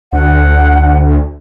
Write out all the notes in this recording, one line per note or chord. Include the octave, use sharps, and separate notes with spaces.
D2 F#5